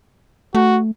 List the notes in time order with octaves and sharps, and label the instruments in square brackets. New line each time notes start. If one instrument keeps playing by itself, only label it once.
[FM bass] A3 [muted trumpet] F#4